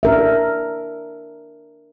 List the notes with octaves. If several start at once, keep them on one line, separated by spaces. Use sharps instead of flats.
D4 A#4 E5